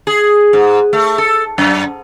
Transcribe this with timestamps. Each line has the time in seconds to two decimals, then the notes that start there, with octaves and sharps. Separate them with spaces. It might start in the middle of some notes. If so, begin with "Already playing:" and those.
0.07 G#4
0.53 G#2
0.93 A3
1.18 A4
1.58 F#2